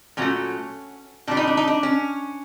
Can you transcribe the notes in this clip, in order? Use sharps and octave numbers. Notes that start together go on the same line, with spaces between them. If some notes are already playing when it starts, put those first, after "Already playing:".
A#2 F#3 A3 C#4
A#2 G3 D4
D#4
D4
D#4
D4
C#4